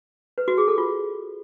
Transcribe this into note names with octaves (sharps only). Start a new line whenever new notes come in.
B4
F#4
G#4
A4
F4